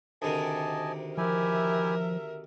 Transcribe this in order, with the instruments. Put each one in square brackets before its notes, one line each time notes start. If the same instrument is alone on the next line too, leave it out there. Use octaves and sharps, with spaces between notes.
[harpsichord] D2 C3 D#3 [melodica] D#5 G#5 A5
[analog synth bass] F3 [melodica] E4 G4 G#5 [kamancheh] A#4 E5